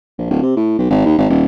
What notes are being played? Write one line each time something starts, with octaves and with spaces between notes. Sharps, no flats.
A#1
D1
C3
A2
B1
G#1
D#2
G#1
D#1